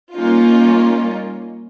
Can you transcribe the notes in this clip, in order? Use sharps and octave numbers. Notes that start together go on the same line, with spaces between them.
G3 A#3 C#4 D#4 F4